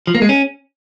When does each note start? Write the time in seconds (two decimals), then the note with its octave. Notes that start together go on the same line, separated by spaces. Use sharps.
0.07 F3
0.15 A#3
0.22 G#3
0.29 C#4